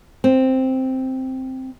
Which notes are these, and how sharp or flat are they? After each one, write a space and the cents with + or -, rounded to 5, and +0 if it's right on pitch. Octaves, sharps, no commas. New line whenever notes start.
C4 +0